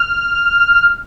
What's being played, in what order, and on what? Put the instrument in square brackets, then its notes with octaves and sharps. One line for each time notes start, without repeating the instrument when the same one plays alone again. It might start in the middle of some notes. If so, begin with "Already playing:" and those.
Already playing: [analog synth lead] F6